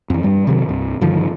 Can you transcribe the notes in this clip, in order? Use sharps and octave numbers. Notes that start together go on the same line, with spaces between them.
F2 E3
G2 G3
C3 D#3 F#3
C2 G2
G2 D3 D#3 F3